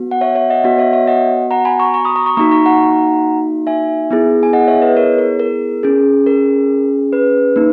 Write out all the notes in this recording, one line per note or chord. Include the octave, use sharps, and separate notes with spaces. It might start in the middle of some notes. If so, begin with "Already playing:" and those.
Already playing: B3 F#4
F#5
C#5 E5
C#5 E5
D#5 F#5
B3 F#4 D#5 F#5
C#5 E5
C#5 E5
D#5 F#5
F#5 A#5
G#5 B5
A#5 C#6
A#5 C#6
B5 D#6
A#5 C#6
A#5 C#6
A#3 D#4 F#4 A#5 C#6
A#5 C#6
F#5 A#5
E5 G#5
B3 E4 G#4
G#5
D#5 F#5
C#5 E5
B4 D#5
A#4 C#5
A#4
A#4
C#4 G#4
A#4
B4
A#3 D#4